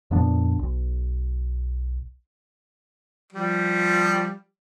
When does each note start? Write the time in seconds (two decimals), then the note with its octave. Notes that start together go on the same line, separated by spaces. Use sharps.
0.11 F2 A#2 B3 D4
0.59 B1
3.33 F3 G3